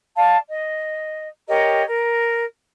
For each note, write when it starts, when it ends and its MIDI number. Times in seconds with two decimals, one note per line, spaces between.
0.16 0.36 74
0.16 0.36 77
0.16 0.36 81
0.47 1.26 75
1.47 1.81 67
1.47 1.81 70
1.47 1.81 73
1.47 1.81 75
1.85 2.43 70